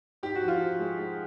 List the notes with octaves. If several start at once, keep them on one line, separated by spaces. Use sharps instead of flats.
G#2 G4
F#4
F3
F4
F3
G#3
G#3